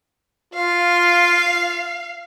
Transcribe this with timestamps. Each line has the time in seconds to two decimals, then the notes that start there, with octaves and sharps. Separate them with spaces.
0.54 F4 F5